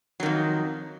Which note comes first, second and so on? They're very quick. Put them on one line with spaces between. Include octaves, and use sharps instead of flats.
F#3 D#3 F2